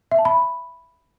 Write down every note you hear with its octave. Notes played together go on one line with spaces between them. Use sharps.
E5
A5
B5